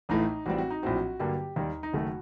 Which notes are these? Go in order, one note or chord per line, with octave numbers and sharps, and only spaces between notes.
A1 A2 A3 D#4
A1 A2 G3 C4 F#4
F#4
D#4
A#1 A2 F#3 C4 F#4
G2 D3 F#3 A#3 G4
D#2 D#3 G3 D#4
D#4
F#1 F#2 D#3 A3 F#4